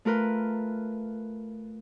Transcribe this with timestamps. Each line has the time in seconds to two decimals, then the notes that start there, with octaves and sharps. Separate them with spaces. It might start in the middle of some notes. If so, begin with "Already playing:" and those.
0.05 A3 F4 A#4 B4